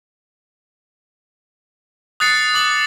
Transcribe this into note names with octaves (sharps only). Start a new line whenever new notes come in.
D#6 F#6 A6 C7 C#7
D6 F#7